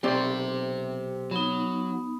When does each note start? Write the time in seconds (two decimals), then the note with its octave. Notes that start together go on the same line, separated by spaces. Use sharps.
0.03 B1 C4 G4 C5 D5
1.31 F#3 B3 D#4